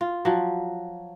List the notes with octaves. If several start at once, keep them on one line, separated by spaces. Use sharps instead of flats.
F4
F3 F#3